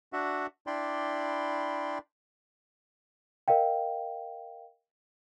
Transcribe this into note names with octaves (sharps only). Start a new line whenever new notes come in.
D4 F#4 E5 F#5
D4 E4 D5 G5 B5 C6
A#4 D#5 F5 G5